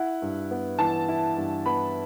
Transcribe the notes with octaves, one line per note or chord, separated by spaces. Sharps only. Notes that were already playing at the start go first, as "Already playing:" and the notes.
Already playing: E4 F#5
G2
B3
E3 A5
E4
G2
B3 B5